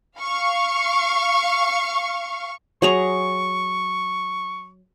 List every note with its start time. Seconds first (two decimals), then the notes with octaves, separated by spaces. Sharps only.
0.19 F5 C#6
2.82 F#3 G#4 A#5 C#6